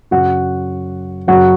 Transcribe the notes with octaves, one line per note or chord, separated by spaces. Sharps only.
F#2 C#3 F#3 F#4 F#5
F#2 C#3 F#3 F#4 F#5